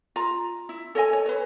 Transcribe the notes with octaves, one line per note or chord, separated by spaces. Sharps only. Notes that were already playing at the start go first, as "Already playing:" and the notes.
F4 A#5
E4
A4 C#5 D#5 G#5
C#5
B4 C#5